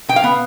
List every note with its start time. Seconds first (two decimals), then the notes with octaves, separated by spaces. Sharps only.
0.08 B2 G5
0.16 F5
0.24 B3